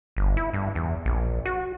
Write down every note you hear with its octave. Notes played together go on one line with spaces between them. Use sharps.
G1
E4
G2
E2
A#1
F#4